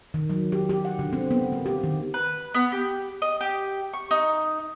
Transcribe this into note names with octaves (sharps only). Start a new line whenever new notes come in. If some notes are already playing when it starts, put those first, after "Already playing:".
D#3
F#3
G4
G4
F#5
D3
C4
B3
A#3
G4
D#3
B4
B3
G4
D#5
G4
C#6
D#4